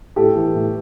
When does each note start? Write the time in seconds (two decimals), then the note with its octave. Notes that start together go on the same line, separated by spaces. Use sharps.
0.16 A2 G4 A4
0.35 E3
0.55 A2